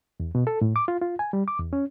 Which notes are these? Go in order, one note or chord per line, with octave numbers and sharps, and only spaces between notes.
E2
B2
A4
A2
D6
F4
F4
G#5
G3
D6
E2
C#4